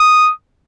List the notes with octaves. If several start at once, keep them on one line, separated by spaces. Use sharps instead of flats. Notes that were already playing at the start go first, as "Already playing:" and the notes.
Already playing: D#6